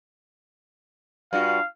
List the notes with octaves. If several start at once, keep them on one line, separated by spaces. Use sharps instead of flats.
G2 F4 F#4 F5